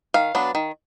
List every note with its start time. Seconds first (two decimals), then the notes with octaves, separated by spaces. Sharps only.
0.14 D#3 F5
0.35 F#3 B3 D4
0.55 D#3